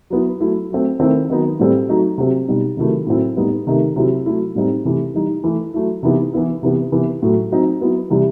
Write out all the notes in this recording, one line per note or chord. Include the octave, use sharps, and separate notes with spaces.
F#3 B3 E4
F#3 A3 E4
F#3 A3 C4
D#3 A3 C4 E4
D#3 F#3 B3 D#4
A2 G3 C4
F#3 A3 D#4
C3 F#3 C4
B2 G3 D#4
C3 D#3 F#3 A3 E4
A2 F#3 A3 C4 E4
A2 G3 B3 D#4
C3 D#3 A3 D#4
C3 F#3 C4 E4
F#3 A3 E4
A2 G3 C4 D#4
C3 E3 A3
E3 G3 D#4
E3 A3 E4
F#3 A3 E4
C3 E3 B3 D#4
E3 B3 E4
C3 E3 B3
C3 E3 B3
A2 F#3 A3
F#3 C4 D#4
F#3 B3 E4
C3 E3 G3